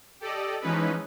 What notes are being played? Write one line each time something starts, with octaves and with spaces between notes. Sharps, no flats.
G4 A4 D5 D#5
E3 F3 G#3 C#4 D#4 B4